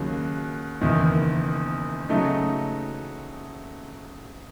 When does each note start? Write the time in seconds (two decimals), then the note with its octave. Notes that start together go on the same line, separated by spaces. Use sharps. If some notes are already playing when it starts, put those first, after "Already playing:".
Already playing: D#2 C#3 F#3
0.81 F#1 E2 D#3
2.09 C#3 F#3 A3 D#4